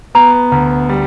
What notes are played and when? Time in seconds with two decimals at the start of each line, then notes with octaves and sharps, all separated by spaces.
0.15 B3 A#5
0.52 D2
0.89 G3